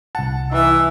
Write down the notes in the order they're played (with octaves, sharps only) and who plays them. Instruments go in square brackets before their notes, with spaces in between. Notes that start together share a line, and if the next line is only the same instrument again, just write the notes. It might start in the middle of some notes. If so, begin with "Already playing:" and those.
[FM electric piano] C2 F#5 [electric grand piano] A5
[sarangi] E3 [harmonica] E5